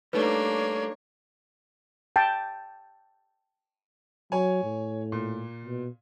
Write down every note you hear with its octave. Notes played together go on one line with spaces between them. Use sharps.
G3 A3 A#3 D4 D#4 B4 C#5
G5 A5
F#3 C#5 G#5
A2
A#2
B2